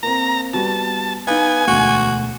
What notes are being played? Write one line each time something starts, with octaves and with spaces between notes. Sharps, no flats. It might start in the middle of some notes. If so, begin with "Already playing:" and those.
A#3 C4 A#5
G3 B3 F#4 A5
B3 D#4 F5 G#5
E1 D2 F#4